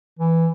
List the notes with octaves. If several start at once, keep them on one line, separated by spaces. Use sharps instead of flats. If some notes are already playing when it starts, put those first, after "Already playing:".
E3